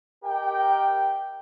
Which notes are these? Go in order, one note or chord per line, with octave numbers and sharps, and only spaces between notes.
G4 A#4 D#5 G5